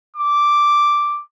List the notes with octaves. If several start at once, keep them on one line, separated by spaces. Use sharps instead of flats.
D6